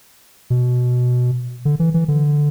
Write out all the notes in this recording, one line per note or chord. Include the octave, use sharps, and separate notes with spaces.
B2
D3
E3
E3
D3